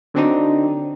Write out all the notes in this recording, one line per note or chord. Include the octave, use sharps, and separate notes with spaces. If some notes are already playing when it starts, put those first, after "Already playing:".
D3 F#3 C4 D4 D#4